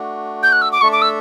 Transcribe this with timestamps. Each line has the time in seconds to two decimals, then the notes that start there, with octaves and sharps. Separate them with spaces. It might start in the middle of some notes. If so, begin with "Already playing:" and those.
Already playing: A3 D4 F#4
0.43 G6
0.52 F#6
0.62 E6
0.72 D6
0.81 A3 D4 A4 E5 C#6
0.92 D6
1.01 E6